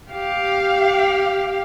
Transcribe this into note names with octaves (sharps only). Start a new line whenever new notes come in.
G4 F5